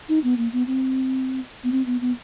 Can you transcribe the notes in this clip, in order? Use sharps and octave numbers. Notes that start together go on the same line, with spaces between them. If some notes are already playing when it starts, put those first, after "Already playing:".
D#4
B3
A#3
B3
C4
B3
C4
B3
B3